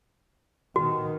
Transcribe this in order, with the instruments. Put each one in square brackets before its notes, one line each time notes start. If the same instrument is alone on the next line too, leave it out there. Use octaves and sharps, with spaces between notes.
[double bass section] B2 D#3 [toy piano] F#4